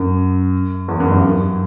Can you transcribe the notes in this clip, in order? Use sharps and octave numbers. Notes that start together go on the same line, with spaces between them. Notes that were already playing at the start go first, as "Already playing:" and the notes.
Already playing: F#2
E2
F#2
G2
F#2